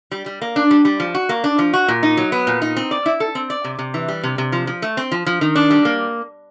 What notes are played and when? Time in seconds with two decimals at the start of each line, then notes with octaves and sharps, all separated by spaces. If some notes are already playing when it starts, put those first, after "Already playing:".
0.12 G3
0.26 G3
0.42 A#3
0.56 D4
0.71 G3
0.85 G3
1.00 F3
1.15 F#4
1.29 A#3
1.44 D4
1.59 F3
1.73 F#4
1.88 A#2
2.03 D#4
2.17 F#3
2.32 B3
2.47 A#2
2.62 D#4
2.76 C4
2.91 D5
3.06 E4
3.20 A4
3.35 C4
3.50 D5
3.64 C3
3.79 C3
3.94 E3
4.08 G3
4.23 C3
4.38 C3
4.52 F3
4.67 F3
4.82 A3
4.97 C4
5.12 F3
5.26 F3
5.41 D#3
5.55 D4
5.71 G3
5.85 A#3